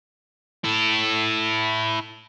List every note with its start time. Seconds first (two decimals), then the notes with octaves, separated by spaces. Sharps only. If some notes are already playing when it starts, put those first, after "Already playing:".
0.64 E4 A4